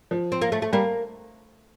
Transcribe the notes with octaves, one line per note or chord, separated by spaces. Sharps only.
F3
C4
A#3
A3
A3
G3 A#3